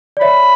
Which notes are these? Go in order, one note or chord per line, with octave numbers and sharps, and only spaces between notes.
D5
C#5 E5 B5